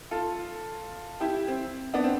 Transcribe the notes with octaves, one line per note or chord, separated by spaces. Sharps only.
F4 A4
E4 G4
C4
B3 D4
C4